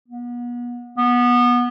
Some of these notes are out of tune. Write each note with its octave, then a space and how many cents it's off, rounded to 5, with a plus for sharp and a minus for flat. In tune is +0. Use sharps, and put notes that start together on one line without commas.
B3 -35
B3 -20